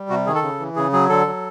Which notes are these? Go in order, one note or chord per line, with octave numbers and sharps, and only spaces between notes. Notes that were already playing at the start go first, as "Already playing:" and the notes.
Already playing: G3
C3 F#4
D#3 G#4
A4
C#3
E3
C#3 G#4
F#3 G#4
D3 A4
F#3